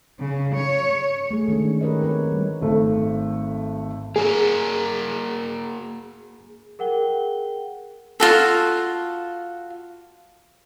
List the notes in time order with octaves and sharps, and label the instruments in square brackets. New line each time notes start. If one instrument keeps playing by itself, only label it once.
[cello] C#3
C#5
[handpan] A3 A#3 G#4
D#3 G#3 C#4 D4
G4 A#4 B4 C#5 D#5
C4 F#4 B4 C#5
G3
[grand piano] G#1 A3
[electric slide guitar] A#3 F#4 A#4 [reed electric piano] G#4
[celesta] G#4 A#4 F#5 G5 G7
[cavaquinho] F4 F#4 A4